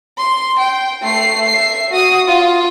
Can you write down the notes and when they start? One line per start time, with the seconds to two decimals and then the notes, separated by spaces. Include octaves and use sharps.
0.18 C6
0.59 G5
1.02 A3 C7
1.48 E5 C7
1.90 F#4 D#6
2.27 F4